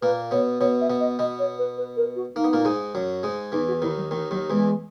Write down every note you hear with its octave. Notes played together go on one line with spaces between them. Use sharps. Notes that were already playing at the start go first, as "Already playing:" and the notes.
A#2 A#3 B4
B2 B3 C#5
B2 B3 C#5
E5
B2 B3
D#5
B2 B3 D#5
C#5
B4
B4
A#4
F#4
A#3 D#4
B3
A#2 A#3
G#2 G#3
F#2 F#3
G#2 G#3
E2 E3 D#4
F#4
D#2 D#3 E4
F#3
D#2 D#3 E3
D#2 D#3 F#3
E2 E3 G#3